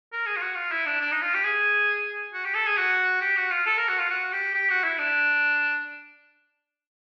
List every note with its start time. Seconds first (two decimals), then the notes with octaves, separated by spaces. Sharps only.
0.12 A#4
0.26 G#4
0.36 F4
0.41 F#4
0.56 F4
0.72 E4
0.86 D4
1.01 D4
1.12 D#4
1.22 F4
1.34 G4
1.45 G#4
2.34 F#4
2.44 G4
2.55 A4
2.66 G#4
2.77 F#4
3.22 G4
3.37 F#4
3.51 F4
3.66 A4
3.77 A#4
3.88 F#4
3.99 F4
4.10 F#4
4.33 G4
4.54 G4
4.70 F#4
4.84 E4
4.98 D4